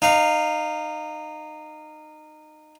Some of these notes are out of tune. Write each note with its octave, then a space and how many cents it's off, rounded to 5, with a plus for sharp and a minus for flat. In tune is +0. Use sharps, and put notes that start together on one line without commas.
D#4 -20 F5 +0